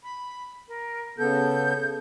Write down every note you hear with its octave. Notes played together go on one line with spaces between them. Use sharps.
B5
A#4
C#3 B3 A4 G6